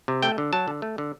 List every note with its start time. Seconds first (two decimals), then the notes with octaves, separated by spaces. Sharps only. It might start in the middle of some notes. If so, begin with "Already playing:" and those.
0.08 C3
0.22 A3 G5
0.38 D3
0.53 F#3 A5
0.68 D3
0.82 A3
0.98 D3